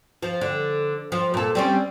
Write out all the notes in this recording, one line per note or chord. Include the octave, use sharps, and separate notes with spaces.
F3
D3
F3
A#2 A4
G3 C4 C#4